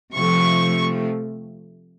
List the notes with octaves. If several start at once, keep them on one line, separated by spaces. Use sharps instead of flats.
C3 F3 A3 C#6